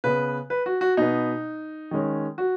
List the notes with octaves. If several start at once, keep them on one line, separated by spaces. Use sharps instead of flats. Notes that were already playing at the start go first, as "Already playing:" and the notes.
C#3 B3 B4
B4
F#4
F#4
B2 B3 D#4
D#3 G#3 C#4
F#4